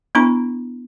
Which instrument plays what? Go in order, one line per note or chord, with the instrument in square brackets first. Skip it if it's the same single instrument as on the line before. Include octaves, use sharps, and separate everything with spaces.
[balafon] B3 D4 E4 A#5